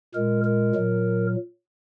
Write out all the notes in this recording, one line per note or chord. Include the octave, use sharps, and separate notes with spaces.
A#2 G#3 A#4
A#4
A#2 F#3